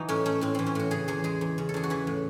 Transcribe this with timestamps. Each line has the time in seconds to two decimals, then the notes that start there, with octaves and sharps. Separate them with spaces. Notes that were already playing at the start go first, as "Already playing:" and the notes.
Already playing: E3 D#4 F#4
0.09 A2 C#4
0.26 A3 C#4
0.41 A2 C4
0.55 E3 C4
0.66 C#4
0.75 A2 F#4
0.91 C#3 G#4
1.08 E2 G#4
1.24 G#3 G#4
1.41 E2
1.58 C#3
1.69 A4
1.74 E2 G#4
1.83 F#4
1.90 E3 E4
2.07 A2